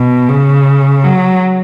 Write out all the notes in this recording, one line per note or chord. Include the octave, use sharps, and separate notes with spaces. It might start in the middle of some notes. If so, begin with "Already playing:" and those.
Already playing: B2
C#3
F#3